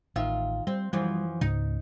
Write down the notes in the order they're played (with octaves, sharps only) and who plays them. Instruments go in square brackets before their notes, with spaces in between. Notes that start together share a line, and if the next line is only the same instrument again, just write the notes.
[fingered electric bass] A1 [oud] D#3 F4 E5
[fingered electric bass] G3 [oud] C4
[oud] F#2 E3 F3 [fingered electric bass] G3
[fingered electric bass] C#2 G#2 C#3 [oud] D#4